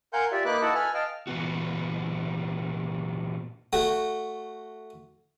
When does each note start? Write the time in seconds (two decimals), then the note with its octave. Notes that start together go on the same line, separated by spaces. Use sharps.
0.13 A#4 F5 F#5 G#5 C6 G6
0.32 F4 G4 D5 E5
0.45 A#3 D#4 B4 B5 D6 F#6
0.62 E4 F#4 A4 D#5 F#5 A5
0.74 A4 B4 G#5 B5 F6
0.94 D#5 F5 G5 A5 F6
1.27 A#2 E3 B3 F#4
3.73 A3 F#4